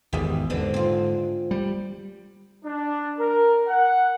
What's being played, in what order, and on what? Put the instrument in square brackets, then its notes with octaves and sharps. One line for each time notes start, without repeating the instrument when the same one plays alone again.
[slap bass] G#1 E2 [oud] G4 G#4
[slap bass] G#2 D3 [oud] C4 D4 B4
[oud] C4 F4
[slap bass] G3
[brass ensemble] D4
A#4
F#5